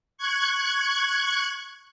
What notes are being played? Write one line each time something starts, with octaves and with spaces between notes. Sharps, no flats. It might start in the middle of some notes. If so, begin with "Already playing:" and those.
C#6 F#6 G#6